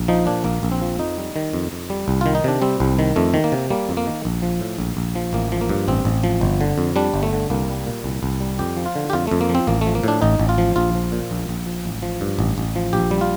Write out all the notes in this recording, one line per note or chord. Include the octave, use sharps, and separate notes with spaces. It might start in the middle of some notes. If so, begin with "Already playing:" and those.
Already playing: A#1
F3 D#4
A#2 D4
A#1 A#3
A#1
C4
F3
F2 D#4
G3
D#3
F2
F2
G3
C2
D#3 F4
D#4
C3 D4
G3 C4
C2
D#3
F2 A3
D#3
A#3
C3
G3 A#3
F2
A#3
D#3
A#1
F3
A2
A#1
A#1
F3
A1 A#3
F3
A#3
G2
A1 C4
A1
F3
G1
D3
F2
G3 D4
G1
A3
D3
C2 A#3
G3
A#2
C2
C2
G3
F2 G4
F3
F4
D3
G4
F2 F4
F2 A3
A#3
F3
C4
A1 A#3
A3
F3
A#3
A2 D4
A1 D#4
A1
F4
F3
A#1 F4
F3
A#2
A#1
A#1
F3
A1
F3
G2
A1
A1
F3
A#1 G4
G3
F4